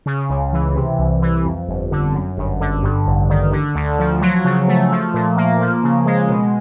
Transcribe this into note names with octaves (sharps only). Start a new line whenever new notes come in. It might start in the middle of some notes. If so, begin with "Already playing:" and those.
C#3
C#2
E3
C3
C2
E3
F2
G1
D3
F#2
G1
D3
G2
A1
D#3
D3
D2
F3
F#3
C#3
A3
F3
A#2
A#3
F3
C#3
G#3
B2